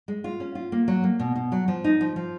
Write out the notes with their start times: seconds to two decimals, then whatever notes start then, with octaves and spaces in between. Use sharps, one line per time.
0.08 G#3
0.24 F4
0.40 C#4
0.55 F4
0.72 A#3
0.88 F#3
1.04 A#3
1.20 B2
1.36 B2
1.52 F#3
1.68 F3
1.84 D#4
2.01 F3
2.16 F3